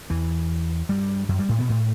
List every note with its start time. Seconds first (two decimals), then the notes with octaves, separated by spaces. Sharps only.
0.10 E2 E3
0.89 G2 G3
1.29 F#2 F#3
1.39 G2 G3
1.49 A2 A3
1.59 B2 B3
1.69 A2 A3